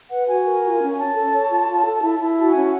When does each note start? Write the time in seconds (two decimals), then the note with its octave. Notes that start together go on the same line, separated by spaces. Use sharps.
0.11 B4 F#5
0.27 F#4 G#5
0.45 A#4
0.64 F4
0.81 C#4
0.97 C#5 A5
1.15 A4
1.33 C#5
1.50 F4
1.68 F4
1.85 A4
2.02 E4
2.20 E4
2.38 F#4 A5
2.50 G#5
2.55 C#4